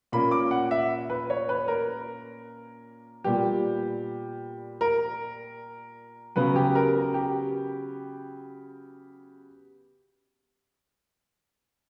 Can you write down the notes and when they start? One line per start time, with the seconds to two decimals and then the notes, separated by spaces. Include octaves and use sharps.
0.12 A#2 A#3 C#4 B5
0.31 D6
0.51 F#5
0.71 E5
1.10 B4
1.30 C#5
1.49 B4
1.68 A#4
3.24 A#2 G3 B3 G4
4.81 A#4
6.36 C#3 F#3 B3 B4
6.56 G4
6.75 A#4
6.95 A#4
7.14 G4